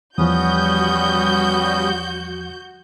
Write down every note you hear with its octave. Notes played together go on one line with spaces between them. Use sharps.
E2 F3 G3 B3 C#4 F#4 D#6 G6